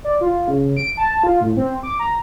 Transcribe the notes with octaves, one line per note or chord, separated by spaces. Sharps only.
D5
F4
C#3
D7
A5
F4
A2
C4
D6
A#5